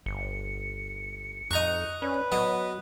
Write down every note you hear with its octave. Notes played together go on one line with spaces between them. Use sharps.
G1 C#7
F2 D#4 D#5 A#5 C#6 F#6
C#4 B4 D5
F#3 B3 D#5